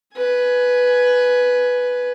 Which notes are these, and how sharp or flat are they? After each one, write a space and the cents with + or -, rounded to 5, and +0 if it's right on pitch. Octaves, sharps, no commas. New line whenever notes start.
B4 +0 G#5 +15